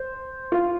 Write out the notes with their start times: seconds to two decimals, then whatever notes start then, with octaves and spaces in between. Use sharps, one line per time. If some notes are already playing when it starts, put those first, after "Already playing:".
Already playing: C5
0.52 F4